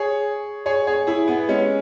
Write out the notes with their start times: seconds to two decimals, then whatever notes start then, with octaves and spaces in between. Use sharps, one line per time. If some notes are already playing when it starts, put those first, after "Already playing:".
Already playing: G#4 C#5
0.66 G#4 C#5
0.87 G#4 C#5
1.07 E4 G#4
1.28 B3
1.49 G#3 C#4